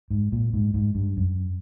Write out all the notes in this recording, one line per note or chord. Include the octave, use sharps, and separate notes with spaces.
G#2
A#2
G#2
G#2
G2
F#2